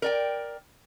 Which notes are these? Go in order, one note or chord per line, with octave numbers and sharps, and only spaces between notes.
A#4 D5 G5